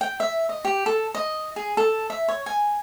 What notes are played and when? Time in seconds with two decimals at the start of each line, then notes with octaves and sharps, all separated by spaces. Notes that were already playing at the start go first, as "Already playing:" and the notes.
0.01 G5
0.20 E5
0.49 D#5
0.65 G4
0.86 A4
1.15 D#5
1.56 G#4
1.77 A4
2.10 E5
2.28 C#5
2.46 G#5